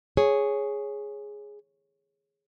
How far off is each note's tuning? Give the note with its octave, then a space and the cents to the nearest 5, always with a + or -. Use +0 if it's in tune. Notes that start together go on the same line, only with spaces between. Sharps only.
G#4 +0 C#5 +0